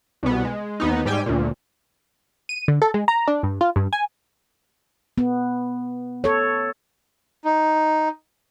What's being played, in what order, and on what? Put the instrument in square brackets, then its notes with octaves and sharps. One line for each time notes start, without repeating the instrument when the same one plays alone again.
[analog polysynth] C2 B2 B3
G#3
D#2 B3 D#4
G#2 G3 G4 G5 G#5
D2 A#2
[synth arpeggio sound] D#7
D3
A4
G#3
A#5
D4
G2
F4
G2
G#5
[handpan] B3
A4 C#5
[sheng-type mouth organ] D#4